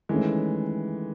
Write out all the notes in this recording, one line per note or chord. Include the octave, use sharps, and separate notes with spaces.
D#3 E3 G#3 A3 C#4